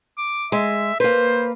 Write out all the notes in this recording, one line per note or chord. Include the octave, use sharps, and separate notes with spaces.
D6
G#3 E5
A#3 B4 C5